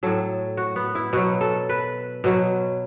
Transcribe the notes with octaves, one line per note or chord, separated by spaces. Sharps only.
A2 F#3 A4
F#4
B3
E4
B2 F#3 F#4
A4
B4
B2 F#3